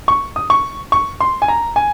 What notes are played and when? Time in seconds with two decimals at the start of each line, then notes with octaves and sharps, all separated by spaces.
0.08 C#6
0.36 D#6
0.50 C#6
0.92 C#6
1.21 C6
1.42 G#5
1.48 A#5
1.76 G#5